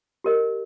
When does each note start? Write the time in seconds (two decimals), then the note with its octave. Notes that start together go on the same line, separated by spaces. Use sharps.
0.24 G4 A#4 D#5